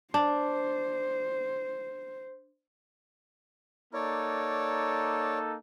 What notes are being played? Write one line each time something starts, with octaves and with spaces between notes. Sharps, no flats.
D4 C5
A#3 D#4 A4 C#5 D5